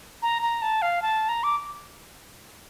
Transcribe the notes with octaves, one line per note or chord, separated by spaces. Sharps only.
A#5
A#5
A5
F5
A5
A#5
D6